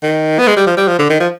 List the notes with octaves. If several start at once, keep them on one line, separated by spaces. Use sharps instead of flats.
D#3
B3
G#3
G3
F3
G3
F3
D3
D#3
F3